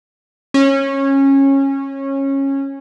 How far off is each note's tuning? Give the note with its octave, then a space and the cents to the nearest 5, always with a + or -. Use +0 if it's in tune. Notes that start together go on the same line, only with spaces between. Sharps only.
C#4 -20